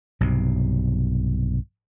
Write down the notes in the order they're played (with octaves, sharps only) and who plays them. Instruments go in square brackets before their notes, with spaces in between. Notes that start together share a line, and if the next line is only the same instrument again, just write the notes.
[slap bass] B1 G2 C3